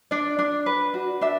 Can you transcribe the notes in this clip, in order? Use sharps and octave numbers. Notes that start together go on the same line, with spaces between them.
D4 D5
D4
B4
F#4
D4 E5